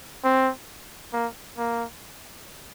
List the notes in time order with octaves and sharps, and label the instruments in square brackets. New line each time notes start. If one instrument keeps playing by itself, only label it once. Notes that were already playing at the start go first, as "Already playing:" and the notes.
[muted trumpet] C4
A#3
A#3